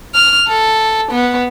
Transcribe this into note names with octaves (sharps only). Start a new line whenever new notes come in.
F6
A4
B3